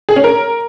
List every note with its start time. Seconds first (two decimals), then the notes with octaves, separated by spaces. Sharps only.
0.09 G#4
0.16 C#4
0.24 A#4